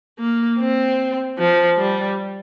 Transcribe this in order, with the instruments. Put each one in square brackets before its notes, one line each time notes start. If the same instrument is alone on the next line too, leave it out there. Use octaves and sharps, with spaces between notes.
[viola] A#3
C4
F3
G3